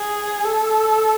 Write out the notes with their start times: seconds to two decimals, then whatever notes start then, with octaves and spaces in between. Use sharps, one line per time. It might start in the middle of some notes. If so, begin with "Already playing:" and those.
Already playing: G#4
0.44 A4